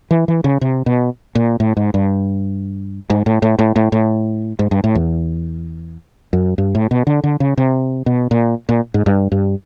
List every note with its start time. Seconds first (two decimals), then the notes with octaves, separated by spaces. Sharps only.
0.11 E3
0.28 E3
0.44 C#3
0.61 C3
0.86 B2
1.35 A#2
1.60 A2
1.77 G#2
1.94 G2
3.10 G#2
3.26 A2
3.42 A2
3.59 A2
3.76 A2
3.92 A2
4.59 G#2
4.71 G2
4.84 A2
4.95 E2
6.33 F#2
6.58 G2
6.75 A2
6.91 B2
7.07 D3
7.24 D3
7.40 C#3
7.57 C3
8.06 B2
8.31 A#2
8.69 A#2
8.94 G#2
9.06 G2
9.32 G2